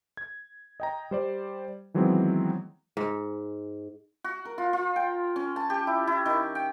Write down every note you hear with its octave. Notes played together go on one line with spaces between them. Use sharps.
G#6
D#5 G5 A#5
G3 C5 D5
D#3 E3 F#3 G#3 B3 C4
G#2
F#4
A#4
F4
F4
G5
C#4
A5
G4
E4
E4
D#3
G5